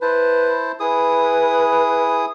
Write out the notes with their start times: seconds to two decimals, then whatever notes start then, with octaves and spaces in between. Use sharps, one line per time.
0.02 E4 B4 C5 A5
0.80 E4 G#4 B4 D#6